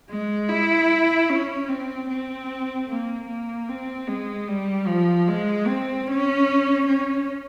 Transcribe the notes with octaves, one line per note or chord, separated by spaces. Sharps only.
G#3
E4
C#4
C4
C4
A#3
A#3
C4
G#3
G3
F3
G#3
C4
C#4
C#4